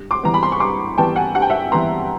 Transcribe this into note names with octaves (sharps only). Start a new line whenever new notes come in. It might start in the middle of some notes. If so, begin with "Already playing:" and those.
Already playing: G2
C6 D6
E3 G3 B3 A#5
B5
C6
C#6
G2 C6 D6
E3 G3 B3 G5 A5
F#5 G#5
G2 F#5
G5
E5 F#5
E3 G3 B3 A#5 C6